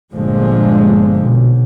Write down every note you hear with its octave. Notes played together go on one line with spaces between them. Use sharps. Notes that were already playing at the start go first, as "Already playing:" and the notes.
G1 A#2 D3 F3 G#3
B1